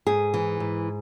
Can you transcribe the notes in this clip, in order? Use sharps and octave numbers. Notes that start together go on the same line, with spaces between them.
G#2 G#4
E3
G#2